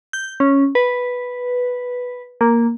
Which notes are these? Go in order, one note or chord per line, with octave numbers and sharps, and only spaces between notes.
G6
C#4
B4
A#3